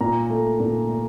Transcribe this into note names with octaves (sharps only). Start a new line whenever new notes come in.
A#2 A#5
A3
A#2
A3